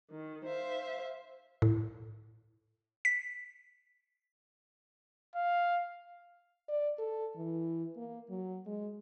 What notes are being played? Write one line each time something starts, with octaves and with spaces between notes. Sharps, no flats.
D#3
C5 E5 F5
A2
B6
F5
D5
A4
E3
A#3
F#3
G#3